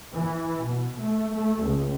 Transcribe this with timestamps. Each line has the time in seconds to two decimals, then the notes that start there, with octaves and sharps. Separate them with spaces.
0.14 E3
0.64 B2
1.00 A3
1.35 A3
1.64 C#2